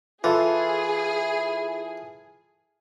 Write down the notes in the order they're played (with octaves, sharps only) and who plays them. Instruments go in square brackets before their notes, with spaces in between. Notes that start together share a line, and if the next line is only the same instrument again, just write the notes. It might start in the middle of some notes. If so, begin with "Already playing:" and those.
[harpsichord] E3 [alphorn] E4 [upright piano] F4 A4 [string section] G#4